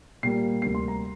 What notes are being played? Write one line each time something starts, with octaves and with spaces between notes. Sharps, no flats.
A#2 G3 A#3 C7
D2 C3 G3 A#3 C7
C6
A#5